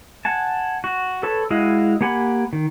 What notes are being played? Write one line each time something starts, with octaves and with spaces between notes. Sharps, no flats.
F#5 G#5 A5
F#4
A4 B4 C#5 A5
G#3 E4 F#4 D#5 F5
A#3 G4 F#5 G#5 B5
D#3